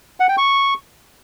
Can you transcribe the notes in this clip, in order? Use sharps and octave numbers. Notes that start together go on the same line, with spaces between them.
F#5
G5
C#6